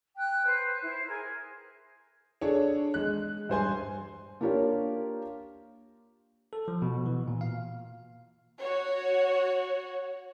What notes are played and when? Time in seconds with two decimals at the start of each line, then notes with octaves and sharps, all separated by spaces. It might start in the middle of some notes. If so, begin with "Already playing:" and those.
0.15 G5 F#6
0.46 B4 C5
0.81 E4 C5
1.08 G#4 A#4
2.41 D4 G#4 A4 C#5
2.94 G#3 F#6
3.49 G2 C5 G#5 C6
4.41 A#3 D4 F4 G4 A#4 C#5
6.53 A4
6.68 F3
6.82 B2
7.06 E3
7.28 A#2
7.41 F5
8.60 F#4 C#5